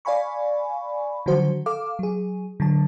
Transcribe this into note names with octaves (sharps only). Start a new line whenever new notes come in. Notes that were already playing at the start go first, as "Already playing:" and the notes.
D5 F5 G#5 B5 C#6
D3 D#3 F3 F#3 F#4 C5
A4 F5 D6
F#3 G#4
D3 F#3 A5